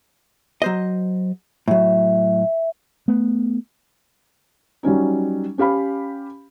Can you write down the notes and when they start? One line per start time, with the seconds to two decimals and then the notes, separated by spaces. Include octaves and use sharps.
0.62 F#3 C5 D#5
1.68 A2 F#3 E5
3.08 A3 B3
4.83 F#3 G3 C#4 D#4
5.58 C#4 G4 F5 B5